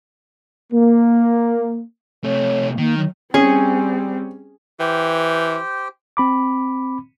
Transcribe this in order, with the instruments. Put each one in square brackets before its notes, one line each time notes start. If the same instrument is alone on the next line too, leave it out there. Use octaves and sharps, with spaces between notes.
[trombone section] A#3
[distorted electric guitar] C3 A3 [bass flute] C#5
[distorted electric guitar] D#3 [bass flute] A#3
[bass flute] F#3
[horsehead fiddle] G3 C4 [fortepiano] C#4 [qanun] G#4 C#6
[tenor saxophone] E3 [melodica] G4 C5 G5
[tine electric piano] C4 B5 D6